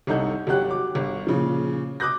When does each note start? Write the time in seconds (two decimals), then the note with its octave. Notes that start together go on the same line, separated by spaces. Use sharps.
0.07 G1 C2 D#4 A4 F#5 G6
0.47 G1 F#3 G3 G4 F#5 F#6
0.71 D6
0.95 G1
1.27 A#2 C#3 F3
2.00 D6 D#6 F#6 G6 A#6